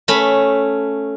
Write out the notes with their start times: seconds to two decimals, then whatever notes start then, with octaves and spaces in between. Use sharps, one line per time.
0.08 A3 C#4 B5